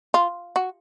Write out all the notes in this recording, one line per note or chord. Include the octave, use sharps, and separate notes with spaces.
F4
F#4